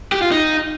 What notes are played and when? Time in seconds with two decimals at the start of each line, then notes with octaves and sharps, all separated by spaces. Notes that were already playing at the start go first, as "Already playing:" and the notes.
0.12 G4
0.22 F4
0.31 D#4